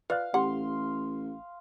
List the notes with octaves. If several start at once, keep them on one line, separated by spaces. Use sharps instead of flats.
F4 B4 D5 F5 F#6
A1 G4 F#5 C6